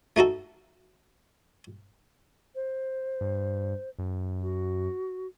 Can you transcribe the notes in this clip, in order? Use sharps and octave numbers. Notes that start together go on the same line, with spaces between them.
A3 D#4 F#4 A4
C5
G2
F#2
F#4